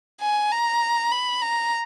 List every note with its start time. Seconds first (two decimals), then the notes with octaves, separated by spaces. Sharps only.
0.21 G#5
0.52 A#5
1.12 B5
1.42 A#5